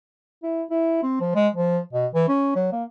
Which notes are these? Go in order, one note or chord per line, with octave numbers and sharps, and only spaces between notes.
E4
E4
C4
F3
G#3
F3
B2
E3
C#4
F#3
A#3